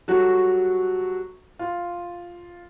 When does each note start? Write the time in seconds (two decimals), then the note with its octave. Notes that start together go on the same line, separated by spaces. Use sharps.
0.08 F#3 G3 F#4 A4
1.59 F4